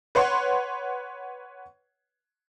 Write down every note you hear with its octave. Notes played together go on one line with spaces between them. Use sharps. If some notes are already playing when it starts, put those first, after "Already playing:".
B4 C#5 F#5 C6